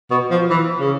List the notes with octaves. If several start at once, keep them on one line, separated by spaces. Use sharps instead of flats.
B2
F3
E3
C#3